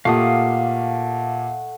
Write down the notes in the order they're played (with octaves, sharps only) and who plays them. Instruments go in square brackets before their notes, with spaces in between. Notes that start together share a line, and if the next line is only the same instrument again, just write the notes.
[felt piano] A#2 G4 [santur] A3 F#5 [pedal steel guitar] F5 D#6